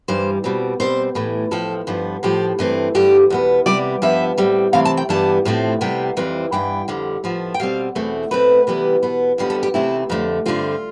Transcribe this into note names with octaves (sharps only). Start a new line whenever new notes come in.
G2 E3 G3 C5
B2 G3 C4
B2 G3 C4 C5
A2 E3 A3
A2 F3 C4 A4
G2 F3 B3
A2 F3 C4 G4
G2 E3 A3 C4
G2 D3 G3 G4
E2 B2 B3
C3 G3 B3 D5
G2 F3 B3 E5
A2 G3 C4
C3 E3 A3 C4 F5
A5
G5
G2 E3 G3 B3 A5
A2 F3 A3 C4
C3 G3 B3 G5
F2 E3 G3 C4
G2 E3 B3 G5
F2 D3 G3
A2 F3 B3
G5
B2 G3 C4 F5
E2 B2 A3 C4
B2 A3 C4 B4
C3 E3 G3 B3
B2 B3
F2 D3 G3 B3
A4
G4
C3 E3 A3 C4 E4
F2 D3 A3
G2 D3 A3 C4 F4